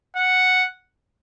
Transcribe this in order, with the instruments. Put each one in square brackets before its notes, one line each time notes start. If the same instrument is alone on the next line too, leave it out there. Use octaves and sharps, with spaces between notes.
[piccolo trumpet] F#5